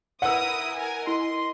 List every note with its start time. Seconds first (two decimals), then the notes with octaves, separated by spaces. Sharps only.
0.22 E4 A#4 B4 D5 F#5 D#6 E6
0.76 A#4 G#5
1.07 E4 D#5 C6